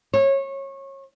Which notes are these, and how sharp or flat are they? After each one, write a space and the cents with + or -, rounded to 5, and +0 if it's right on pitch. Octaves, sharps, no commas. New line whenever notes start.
C#5 -25